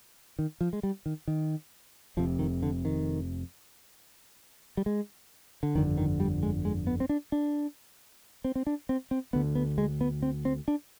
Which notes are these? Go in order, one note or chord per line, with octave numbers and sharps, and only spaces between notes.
D#3
F3
G#3
G3
D#3
D#3
F1 F2 C3 F3
D#3
D3
D#3
G3
G#3
D3
G1 F2 D3 D#3
D#3
G3
G#3
G#3
B3
C4
D4
D4
C4
C4
D4
C4
C4
D2 D3 B3
B3
G#3
B3
C4
C4
D4